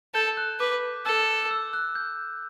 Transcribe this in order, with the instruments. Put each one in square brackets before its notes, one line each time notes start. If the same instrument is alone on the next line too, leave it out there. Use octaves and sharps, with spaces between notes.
[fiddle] A4 [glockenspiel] G6
[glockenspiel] F#6
[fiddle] B4 [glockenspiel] D6
[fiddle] A4 [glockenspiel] E6
[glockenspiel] E6
F#6
G6